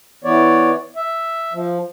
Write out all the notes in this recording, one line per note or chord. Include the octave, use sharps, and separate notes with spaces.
E3 B3 C#5 D5
E5
F3